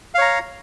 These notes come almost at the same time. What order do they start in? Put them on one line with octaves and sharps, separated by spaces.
F5 C#5 A#5